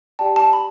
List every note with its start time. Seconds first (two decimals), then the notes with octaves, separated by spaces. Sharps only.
0.19 G4 D5 G5 A5
0.36 A5
0.53 B5